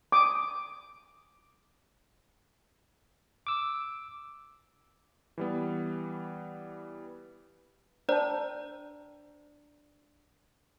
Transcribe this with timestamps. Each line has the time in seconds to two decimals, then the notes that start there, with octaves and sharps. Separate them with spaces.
0.12 D6 D#6
3.47 D6 E6
5.38 E3 G3 B3
8.09 D4 C5 D5 A5 A#5